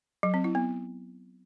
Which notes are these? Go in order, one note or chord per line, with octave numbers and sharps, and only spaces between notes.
F#3
C4
E4
B3